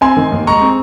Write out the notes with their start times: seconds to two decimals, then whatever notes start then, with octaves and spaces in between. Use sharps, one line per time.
0.01 C4 G#5 C6
0.17 D#3
0.32 D#2
0.47 G#3 A#5 C#6
0.62 C4